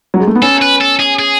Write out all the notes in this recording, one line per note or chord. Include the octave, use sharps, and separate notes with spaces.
F#3
G#3
A3
B3
C#4 A4
B4
A4
G#4
G#4